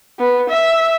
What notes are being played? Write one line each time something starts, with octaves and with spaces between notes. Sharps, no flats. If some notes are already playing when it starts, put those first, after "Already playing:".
B3
E5